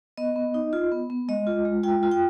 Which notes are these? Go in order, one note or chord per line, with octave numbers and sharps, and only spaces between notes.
B3 D#5
B3
D#4
F4
B3
B3
G#3 D#5
F4
G#3
F4 G5
F4
G5